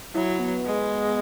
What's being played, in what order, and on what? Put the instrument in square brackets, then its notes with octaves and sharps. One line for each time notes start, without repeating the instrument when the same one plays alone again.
[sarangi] F#3 [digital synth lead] E4
[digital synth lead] B3
[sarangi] G#3